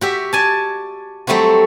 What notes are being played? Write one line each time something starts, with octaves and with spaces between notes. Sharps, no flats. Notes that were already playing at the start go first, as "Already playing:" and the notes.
F#4 G4 E5
D5 G#5 A5
F#3 G3 A3 C4 F#4